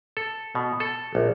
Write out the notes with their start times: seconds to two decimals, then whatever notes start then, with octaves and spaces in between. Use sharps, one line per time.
0.17 A4
0.55 B2
0.80 A4
1.15 A#1